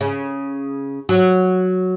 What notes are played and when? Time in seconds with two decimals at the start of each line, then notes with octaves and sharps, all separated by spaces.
0.01 C#3
1.09 F#3